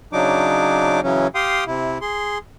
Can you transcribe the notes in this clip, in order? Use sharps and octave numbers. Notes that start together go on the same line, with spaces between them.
C#3 F#3 D4 D#4 D6
C#3 E3 F#3 C#4
G4 F5 G5 C6 D#6
C3 E4
G#4 C6